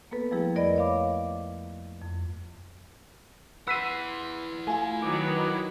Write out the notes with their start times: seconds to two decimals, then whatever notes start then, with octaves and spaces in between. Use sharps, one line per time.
0.11 A#3 B3 A4 B4
0.31 F3 G3 A3 E4 G#4
0.55 F2 A#4 D5 D#5 B5
0.76 C#5 D5 F5 B5 D6
2.01 F2
3.68 E4 B4 F#5 C6 E6 B6 D#7
4.67 A3 F4 G#5
5.02 D#3 F#3 B4 D6